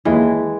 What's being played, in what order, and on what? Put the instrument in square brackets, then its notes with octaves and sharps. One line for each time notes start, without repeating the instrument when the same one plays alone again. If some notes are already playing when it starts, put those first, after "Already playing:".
[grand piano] D#2 [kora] E3 G#3